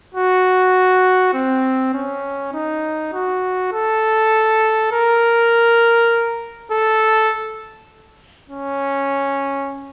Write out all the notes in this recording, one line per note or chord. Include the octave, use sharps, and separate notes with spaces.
F#4
C4
C#4
D#4
F#4
A4
A#4
A4
C#4